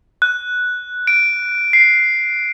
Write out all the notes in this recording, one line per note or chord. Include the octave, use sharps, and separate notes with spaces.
F#6
D7
C7